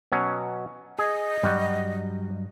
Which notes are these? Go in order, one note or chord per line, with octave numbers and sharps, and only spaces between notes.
B2 F#3 C#4
G#4 D#5
G2 F#3 G3 F#4